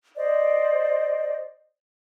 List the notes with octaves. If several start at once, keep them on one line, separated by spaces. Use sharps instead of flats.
C5 D5 D#5